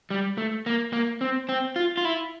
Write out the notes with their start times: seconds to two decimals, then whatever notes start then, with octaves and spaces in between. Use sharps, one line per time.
0.10 G3
0.38 A3
0.66 A#3
0.93 A#3
1.21 C4
1.49 C4
1.76 F4
1.97 F4
2.05 E4